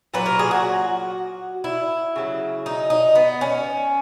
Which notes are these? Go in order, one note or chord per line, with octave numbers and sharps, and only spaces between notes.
A#2 F#3 B4
A#4
G#4
F#4
E4
C#3 F#3
D#4
D#4
B3
C#4